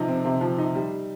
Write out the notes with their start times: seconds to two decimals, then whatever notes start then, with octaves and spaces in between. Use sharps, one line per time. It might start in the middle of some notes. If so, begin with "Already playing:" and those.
Already playing: C3 F3 D#4
0.08 C4
0.25 C3
0.41 F3
0.58 D#4
0.75 G3